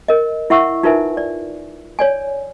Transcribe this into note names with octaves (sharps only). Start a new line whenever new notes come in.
A#4 D#5
E4 E5 F#5 C#6 E6
D#4 F4 A#4 B4 E5 G#5
D5
C#5 D5 G#5